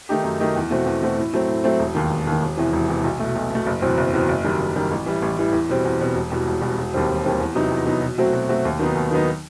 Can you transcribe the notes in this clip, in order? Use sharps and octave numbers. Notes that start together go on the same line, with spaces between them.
D#3 A3 D#4 G4
F#2
D#3 A3 D#4 G4
E2
B2 A3 C4 F#4
E2
B2 A3 C4 F#4
A2
F#3 A3 C4
A2
F#3 A3 C4
E1
D#2 D#3
E1
D#2 D#3
E1
E2 C3 E3
E1
E2 C3 E3
B1
B2 A3
B1
B2 A3
F#1
E2 B2 F#3 C4
F#1
E2 B2 F#3 C4
F#1
F#2 D#3 G3
F#1
F#2 D#3 G3
A1
A2 E3 G3
A1
A2 E3 G3
E2
B2 G3 C4
E2
B2 G3 C4
E1
E2 B2 G3
E1
E2 B2 G3
E1
D#2 D#3 G3 C4
E1
D#2 D#3 G3 C4
E2
C3 F#3 B3 D#4
E2
C3 F#3 B3 D#4
B2
F#3 A3 C4 F#4
B2
F#3 A3 C4 F#4
D#2
D#3 F#3 B3 D#4
D#2
D#3 F#3 B3 D#4